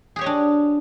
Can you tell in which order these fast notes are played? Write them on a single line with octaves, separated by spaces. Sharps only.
G#4 G4 C#5 D#5 D4